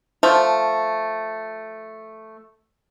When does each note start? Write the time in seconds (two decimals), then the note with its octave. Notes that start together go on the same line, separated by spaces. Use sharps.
0.23 F3 A3